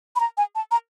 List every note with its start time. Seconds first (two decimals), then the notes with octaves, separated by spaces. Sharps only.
0.16 B5
0.20 A#5
0.37 G#5
0.55 A5
0.71 A#5